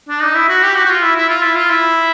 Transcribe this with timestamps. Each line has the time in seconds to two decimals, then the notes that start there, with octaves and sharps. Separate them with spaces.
0.09 D4
0.22 D#4
0.35 E4
0.48 F#4
0.63 G4
0.75 F#4
0.85 F#4
0.89 F4
1.03 E4
1.17 E4
1.29 F4
1.43 E4
1.56 F4
1.70 E4